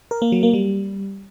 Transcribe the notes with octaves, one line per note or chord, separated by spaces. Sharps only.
A#4
A#3
F#3
A#3
G3